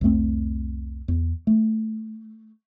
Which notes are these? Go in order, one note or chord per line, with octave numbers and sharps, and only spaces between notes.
C2 F2 A3 C4
E2
A3